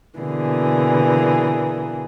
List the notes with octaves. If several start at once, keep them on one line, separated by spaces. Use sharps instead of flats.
B2 D3 E3 A#3 G#4